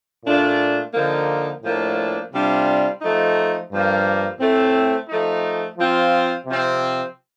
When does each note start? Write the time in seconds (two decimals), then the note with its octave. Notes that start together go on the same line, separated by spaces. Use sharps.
0.24 A#2 A3 D4 F4
0.93 D3 F3 A#3 D#4
1.63 A2 F3 A#3 D4
2.31 C3 G3 D4 F4
3.01 F3 A3 D#4
3.70 G2 F3 A#3
4.39 A2 A3 C4
5.07 F3 A3 D#4
5.76 F3 C4 F4
6.46 C3 F3 C4